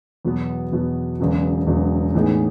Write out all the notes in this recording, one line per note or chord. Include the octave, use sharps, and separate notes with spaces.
E2 B2 F#3 B3
E2 B2 F#3 B3
E1 E2 C#3 F#3
E1 E2 C#3 F#3
A2 E3 B3 D#4 G#4